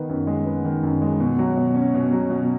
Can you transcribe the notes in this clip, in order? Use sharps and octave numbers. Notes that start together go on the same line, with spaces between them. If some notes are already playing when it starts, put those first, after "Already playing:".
Already playing: D#3 B3 B4
F#2
G#3
B3
D#3
F#2
G#3
B2
F#3
B2
C#4
B2
F#3
B2